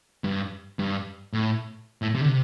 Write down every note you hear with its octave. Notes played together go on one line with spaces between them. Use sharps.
G2
G2
A2
A2
C3
D3
C3